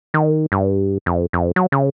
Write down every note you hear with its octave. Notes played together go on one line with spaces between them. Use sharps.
D#3
G2
F2
F2
F#3
C#3